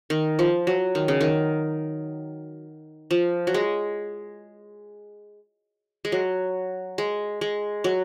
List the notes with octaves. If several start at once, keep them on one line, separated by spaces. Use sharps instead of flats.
D#3
F3
F#3
D#3
C#3
D#3
F3
F#3
G#3
G#3
F#3
G#3
G#3
F#3